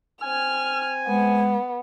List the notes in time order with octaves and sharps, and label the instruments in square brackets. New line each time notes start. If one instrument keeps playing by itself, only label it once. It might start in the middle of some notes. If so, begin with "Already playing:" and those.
[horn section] C4 G#5 [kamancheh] F6
[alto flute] G#3 [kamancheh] B3